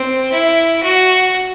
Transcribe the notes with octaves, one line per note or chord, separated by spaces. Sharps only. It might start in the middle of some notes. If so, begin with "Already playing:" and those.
Already playing: C4
E4
F#4